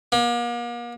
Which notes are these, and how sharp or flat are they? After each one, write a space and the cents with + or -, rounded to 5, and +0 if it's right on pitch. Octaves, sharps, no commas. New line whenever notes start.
A#3 +40